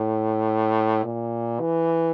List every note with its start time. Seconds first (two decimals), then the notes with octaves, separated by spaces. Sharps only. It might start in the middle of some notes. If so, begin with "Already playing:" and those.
Already playing: A2
1.04 A#2
1.60 E3